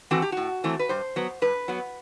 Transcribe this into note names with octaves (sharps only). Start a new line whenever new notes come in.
E3 A3 C4 F#4
G4
A2 F#4
E3 A3 C4
B4
G2 C5
F#3 B3
G2 B4
F#3 B3